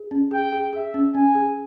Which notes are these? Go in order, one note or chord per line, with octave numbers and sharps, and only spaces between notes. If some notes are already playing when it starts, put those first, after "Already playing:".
Already playing: G#4
C#4
G#4 G5
G#4
G#4 E5
C#4
C#4 G#5
G#4